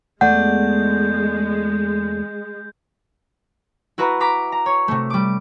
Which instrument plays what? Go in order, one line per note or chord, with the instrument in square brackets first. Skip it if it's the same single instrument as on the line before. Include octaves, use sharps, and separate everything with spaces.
[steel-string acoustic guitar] E2 A3 D5 [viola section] G#3 [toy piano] F#5 [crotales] G6
[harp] E4 F#4 B4 A#5
A#5 D6 B6
A#5
C#5
C3 A3
G3 D6